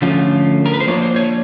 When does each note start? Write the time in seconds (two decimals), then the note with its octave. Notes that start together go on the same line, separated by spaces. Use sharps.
0.02 D3 F3 A3 C#4 F4
0.66 A#4
0.73 B4
0.80 C5
0.87 F3 A#3 D4 F4 C#5
1.02 C5
1.16 C#5